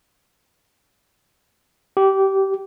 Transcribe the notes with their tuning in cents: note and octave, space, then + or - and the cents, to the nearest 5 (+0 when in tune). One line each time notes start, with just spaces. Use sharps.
G4 -20